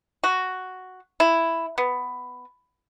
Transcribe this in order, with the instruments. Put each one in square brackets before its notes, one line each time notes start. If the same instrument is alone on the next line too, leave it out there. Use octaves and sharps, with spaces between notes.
[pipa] F#4
E4
B3